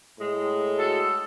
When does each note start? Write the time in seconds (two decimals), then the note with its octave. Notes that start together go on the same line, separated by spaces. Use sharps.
0.17 A2 G#3
0.78 F#4 A4